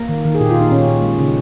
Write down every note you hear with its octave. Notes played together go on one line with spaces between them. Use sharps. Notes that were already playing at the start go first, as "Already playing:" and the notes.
Already playing: A#3 A#4
D#3
D#3
G#4
A#2 G4
F4
A#2
D#4
A#2 C#4
A#2
G#3
C#3